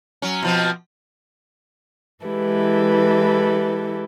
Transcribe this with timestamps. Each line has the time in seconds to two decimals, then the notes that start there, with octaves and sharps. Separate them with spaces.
0.22 F#3 C#4
0.42 B2 F3 C4
2.24 E3 G#3 E4 G4 A4 B4